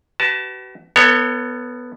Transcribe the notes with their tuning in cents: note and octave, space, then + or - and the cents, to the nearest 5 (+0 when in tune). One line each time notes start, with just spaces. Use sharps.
F#4 +45 B4 +15 A5 +0
B3 +0 A4 +35 C#5 +0